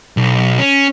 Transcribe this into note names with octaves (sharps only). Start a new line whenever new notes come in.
B1
C#4